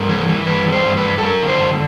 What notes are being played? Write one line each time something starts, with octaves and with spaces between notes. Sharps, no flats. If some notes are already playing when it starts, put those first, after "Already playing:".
Already playing: G2 A#4
E3
E3
G2 B4
E3
C5
G2
B4
G2
A4
F#2 A#4
D3
C5
F#2